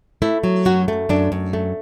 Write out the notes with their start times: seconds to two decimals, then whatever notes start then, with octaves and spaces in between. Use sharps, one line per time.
0.22 A3 E4
0.44 F#3
0.65 F#2 F#4
0.88 A3
1.09 F#2 D4
1.32 F#2
1.53 A3